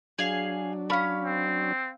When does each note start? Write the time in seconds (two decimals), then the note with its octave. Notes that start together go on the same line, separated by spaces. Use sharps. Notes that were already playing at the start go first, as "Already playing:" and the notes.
0.19 F#3 D4 G#4 F5
0.90 A3 C#4 F5 B5
1.25 C4